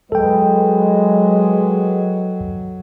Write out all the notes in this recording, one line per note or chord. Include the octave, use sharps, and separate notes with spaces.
F#3 G#3 A4 B4 D#5 G5